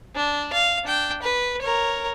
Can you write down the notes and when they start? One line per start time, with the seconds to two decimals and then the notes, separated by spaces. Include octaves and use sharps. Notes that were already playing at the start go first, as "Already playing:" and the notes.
0.16 D4
0.53 F5
0.85 D4 G5
1.22 B4
1.62 A#4 C#5